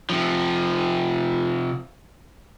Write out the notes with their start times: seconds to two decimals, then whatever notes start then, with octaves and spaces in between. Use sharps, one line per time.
0.10 C3 F3